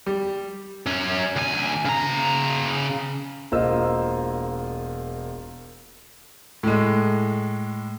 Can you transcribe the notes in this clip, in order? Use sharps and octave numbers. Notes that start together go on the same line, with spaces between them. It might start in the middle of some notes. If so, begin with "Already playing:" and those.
G3
F#2 C#4
D2 G#5
C#3 A#5
E1 A#3 F4 C5 D#5 E6
A2 G#3